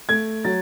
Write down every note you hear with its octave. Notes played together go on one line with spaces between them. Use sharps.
A3 G#6
F#3 A6